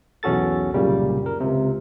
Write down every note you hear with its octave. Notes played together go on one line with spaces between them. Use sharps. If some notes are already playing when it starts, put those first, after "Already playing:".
B1 E2 C#4 F#4 A4 A6
C2 F#2 A#2 C#3 G3
A#4
C#2 C3